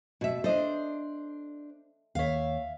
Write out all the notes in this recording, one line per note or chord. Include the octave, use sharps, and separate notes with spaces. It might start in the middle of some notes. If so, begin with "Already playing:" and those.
B2 F#4 E5
D4 A4 C5 D#5
D#2 C#5 E5 F5